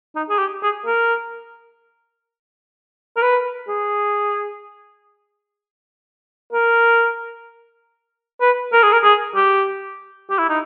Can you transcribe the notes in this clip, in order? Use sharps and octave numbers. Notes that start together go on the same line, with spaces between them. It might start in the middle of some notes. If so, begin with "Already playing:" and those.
D#4
G#4
G4
G#4
A#4
A#4
B4
G#4
A#4
B4
A#4
G#4
A#4
G#4
G4
G4
E4
D#4